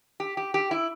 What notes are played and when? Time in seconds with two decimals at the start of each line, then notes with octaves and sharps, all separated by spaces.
0.20 G4
0.37 G4
0.54 G4
0.71 E4